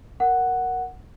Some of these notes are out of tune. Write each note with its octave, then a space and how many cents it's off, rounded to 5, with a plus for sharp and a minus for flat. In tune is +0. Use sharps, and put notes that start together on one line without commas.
A#4 +0 F#5 +0